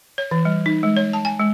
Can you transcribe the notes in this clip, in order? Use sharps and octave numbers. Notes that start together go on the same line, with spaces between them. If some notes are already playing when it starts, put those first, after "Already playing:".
C#5
E3
G3
D#4
G#3
C#5
A5
G#5
G#3